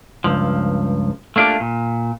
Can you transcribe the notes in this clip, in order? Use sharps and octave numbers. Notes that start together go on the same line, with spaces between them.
C#2 G2 F3
A3 A#3 D4 F4 G4
A#2